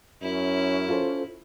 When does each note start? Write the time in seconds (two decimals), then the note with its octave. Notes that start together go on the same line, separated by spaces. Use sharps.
0.22 F#2 C#4 E4
0.89 F4 A4 C5